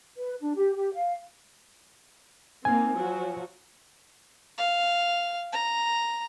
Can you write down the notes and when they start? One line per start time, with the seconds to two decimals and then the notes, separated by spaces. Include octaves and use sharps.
0.17 B4
0.42 D4
0.56 G4
0.76 G4
0.94 F5
2.65 A#3 C4 D#4 G#5
2.97 F3 F#3 F#4
4.58 F5
5.52 A#5